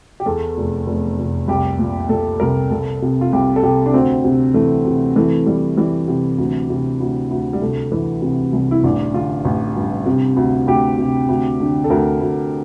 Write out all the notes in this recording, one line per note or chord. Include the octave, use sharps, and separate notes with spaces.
G4
E2 A4
F1
F1
F1
C2 G4
A#2
A#2 A4
C2 A#4
C2 A4
C3
F4
C2 G4
A4
C3 G4
D4
D2 C4
C3
E3 A3
C3
E3 A3
E3 G3
E3 G3
C3
D2
C3
D2
D2
G3
C2 A3
E3
C3
C2
E4
A1 D4
D3 F4
A1
G2
C3
D2
D2 G4
C3
D2
D3
A4
D2 A#4
D2